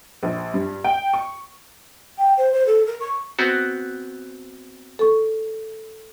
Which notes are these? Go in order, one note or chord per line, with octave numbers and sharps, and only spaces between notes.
A#1
G2
G5
C#6
G5
C5
C5
A4
A#4
C#6
B3 C4 F#4
A4 C#6